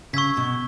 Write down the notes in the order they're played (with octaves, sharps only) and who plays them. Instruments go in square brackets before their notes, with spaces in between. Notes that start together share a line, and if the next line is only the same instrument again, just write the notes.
[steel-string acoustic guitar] C#3 [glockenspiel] C#6 E6 G#6 B6
[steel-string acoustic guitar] B2